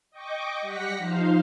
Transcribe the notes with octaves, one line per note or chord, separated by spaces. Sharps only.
D#5 G5 C#6 D6
G3 G4 F#5 A#6 B6 C#7
F3 D#4 C5 F5